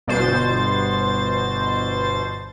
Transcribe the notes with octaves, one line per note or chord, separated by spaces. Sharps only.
G1 B2 C5 A6